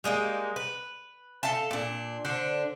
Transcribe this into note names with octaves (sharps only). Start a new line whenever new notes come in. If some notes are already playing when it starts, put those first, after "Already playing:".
G3 G#3 A#3 D#4
B4
A4 E5 F5 A5
A#2 D4
D3 D4 C5